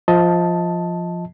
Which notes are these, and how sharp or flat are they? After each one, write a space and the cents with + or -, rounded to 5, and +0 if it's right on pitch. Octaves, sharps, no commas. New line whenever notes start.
F3 +0 D#5 +20 A5 +0